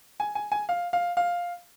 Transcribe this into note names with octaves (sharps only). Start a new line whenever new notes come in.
G#5
G#5
G#5
F5
F5
F5